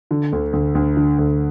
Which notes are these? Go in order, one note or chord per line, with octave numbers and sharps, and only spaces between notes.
D3
D2
D2
D2
D3
D2